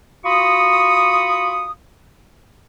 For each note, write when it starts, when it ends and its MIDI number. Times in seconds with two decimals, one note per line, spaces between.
0.25 1.71 65
0.25 1.71 66
0.25 1.71 83
0.25 1.71 85
0.25 1.71 87